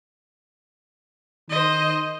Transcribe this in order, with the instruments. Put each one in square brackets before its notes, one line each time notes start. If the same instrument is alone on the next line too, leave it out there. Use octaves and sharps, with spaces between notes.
[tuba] D#3 [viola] C5 D#5